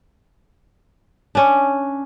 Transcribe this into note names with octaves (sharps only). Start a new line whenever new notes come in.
C#4 D4